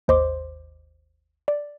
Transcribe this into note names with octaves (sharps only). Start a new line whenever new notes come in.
G#1 D#2 C5 D#5 C6 D6
D5